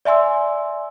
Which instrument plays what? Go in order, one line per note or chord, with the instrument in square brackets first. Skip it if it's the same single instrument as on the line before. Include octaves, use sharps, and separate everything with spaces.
[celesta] D5 E5 G#5 C6 E6